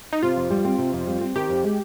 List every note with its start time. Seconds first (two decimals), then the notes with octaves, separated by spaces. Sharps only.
0.13 D#4
0.23 C3 F4
0.36 F2
0.50 G3
0.65 C4
0.78 C3
0.93 F2
1.07 G3
1.21 C4
1.36 D#3 G4
1.49 F2
1.63 G#3